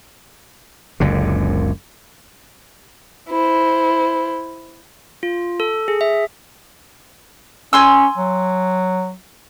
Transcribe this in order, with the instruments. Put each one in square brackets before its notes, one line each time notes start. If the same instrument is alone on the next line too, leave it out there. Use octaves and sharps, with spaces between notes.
[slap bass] F#1 C#2 F#2 D3
[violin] E4 C5
[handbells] F4
A4
G#4
E5
[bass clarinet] C#4 [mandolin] G#5 C6 E6
[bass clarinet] F#3